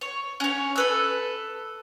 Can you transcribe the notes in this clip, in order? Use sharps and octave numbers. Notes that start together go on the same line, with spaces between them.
C#5
C#4 C#5
A4 B4 E6